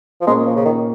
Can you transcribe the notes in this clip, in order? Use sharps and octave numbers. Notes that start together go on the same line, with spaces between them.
F3
A#2 G#3 A#3 C#4
F3
C#3
D#3